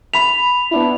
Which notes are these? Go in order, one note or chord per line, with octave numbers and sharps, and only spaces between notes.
B5 B6 F7
B3 D4 E4